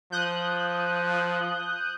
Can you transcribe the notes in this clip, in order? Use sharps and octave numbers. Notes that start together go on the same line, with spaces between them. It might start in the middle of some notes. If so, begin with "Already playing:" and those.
F3 D#6 F#6 G6